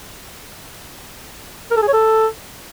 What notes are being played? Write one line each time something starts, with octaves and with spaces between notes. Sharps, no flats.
A#4
A4
G#4
C#5
A4